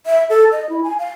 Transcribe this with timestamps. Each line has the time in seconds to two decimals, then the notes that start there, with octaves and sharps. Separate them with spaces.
0.06 E5
0.30 A4
0.52 D#5
0.69 E4
0.84 G#5
0.99 F5